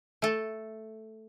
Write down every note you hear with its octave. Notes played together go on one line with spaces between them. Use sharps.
A3 A4